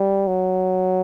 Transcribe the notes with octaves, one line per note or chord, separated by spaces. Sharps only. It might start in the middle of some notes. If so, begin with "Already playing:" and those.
Already playing: G3
F#3